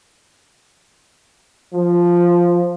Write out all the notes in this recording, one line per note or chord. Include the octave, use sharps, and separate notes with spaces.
F3